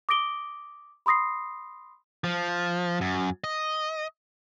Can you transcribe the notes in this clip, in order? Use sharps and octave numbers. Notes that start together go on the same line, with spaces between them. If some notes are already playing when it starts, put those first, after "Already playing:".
D6 D#6 A#6 D7 G7
B5 C6 D#6 A#6 C7
F3
F#2
D#5